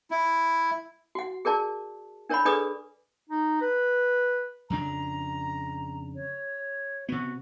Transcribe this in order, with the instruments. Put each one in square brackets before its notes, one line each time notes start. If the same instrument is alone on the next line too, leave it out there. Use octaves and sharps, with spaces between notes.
[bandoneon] E4
[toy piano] F#4 F#5
G#4 A#4 D5 A5
D4 A#4 C#5 D5 F#5 B5
D4 G#4 A4 B4 D5 D#6
[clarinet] D#4
B4
[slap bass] F2 C#3 D4 [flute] A#5
[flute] C#5
[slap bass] C3 B3 [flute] F#4